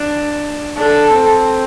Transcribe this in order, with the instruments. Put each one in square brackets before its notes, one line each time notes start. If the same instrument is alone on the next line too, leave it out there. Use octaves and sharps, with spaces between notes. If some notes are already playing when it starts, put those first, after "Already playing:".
Already playing: [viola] D4
[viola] D4 [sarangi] A4
[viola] C4